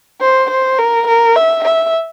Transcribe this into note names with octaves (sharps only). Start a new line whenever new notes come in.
C5
C5
A#4
A#4
E5
E5